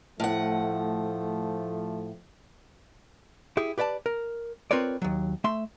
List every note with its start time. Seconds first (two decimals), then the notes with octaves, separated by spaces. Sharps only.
0.20 A2 F3 A3 F#5
3.57 E4 G4 G#4
3.78 G4 B4 D5 F5 A5
4.06 A#4
4.71 C4 F4 A#4 B4 C#5 D5
5.02 D#2 F#3
5.44 A3 E5 C6